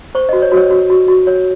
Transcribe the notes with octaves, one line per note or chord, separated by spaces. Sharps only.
C5 C#6
D#5
F#4
C#5
F#4
C#5
F#4
F#4
F#4
C#5